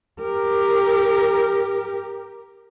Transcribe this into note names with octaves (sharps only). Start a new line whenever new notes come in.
G4 A#4